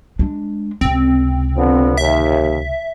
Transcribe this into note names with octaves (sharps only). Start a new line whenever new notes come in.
G#3 D4
C#2 C3 C4
D3 F3 B3
D#2 E5